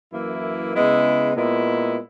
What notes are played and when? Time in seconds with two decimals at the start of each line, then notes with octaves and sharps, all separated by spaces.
0.12 F#2 E3 A#3 E4
0.74 C#3 G#3 B3 E4
1.36 A#2 G#3 B3 E4